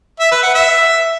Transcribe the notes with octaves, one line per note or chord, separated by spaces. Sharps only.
E5
B4
F#5
E5